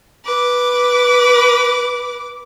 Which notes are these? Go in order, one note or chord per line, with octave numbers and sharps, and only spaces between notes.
B4 D6